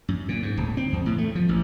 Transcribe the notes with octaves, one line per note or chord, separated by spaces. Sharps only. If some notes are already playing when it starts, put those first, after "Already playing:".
F#2
A#2
G#2
D1
C4
E2
A2
A3
F3
A1